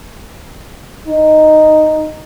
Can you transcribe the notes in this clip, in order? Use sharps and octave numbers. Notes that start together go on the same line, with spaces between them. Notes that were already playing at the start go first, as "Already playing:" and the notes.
D#4